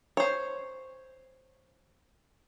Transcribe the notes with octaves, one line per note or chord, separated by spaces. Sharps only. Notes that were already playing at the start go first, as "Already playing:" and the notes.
C5 C#5